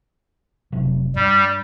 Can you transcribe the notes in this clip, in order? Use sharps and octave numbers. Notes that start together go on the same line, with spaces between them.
F1 C3 F#3
G2 G3